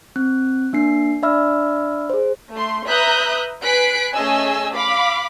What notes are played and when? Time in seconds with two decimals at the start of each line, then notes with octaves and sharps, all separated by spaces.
0.16 C4 F#6
0.73 A#3 D4 C7
1.22 D4 D5 E5 B5 E6 F6
2.10 G#4 C5
2.54 A3 C6
2.88 B4 E5 A#5 D#6 F#6 G6
3.63 B4 G#5 F#6 B6 C7 D7
4.14 A3 C#4 G#4 D#5 G#5 E6
4.74 F5 B5 D6